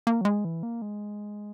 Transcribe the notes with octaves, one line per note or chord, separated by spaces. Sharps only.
A#3
F#3
G#3
E3
A#3
G#3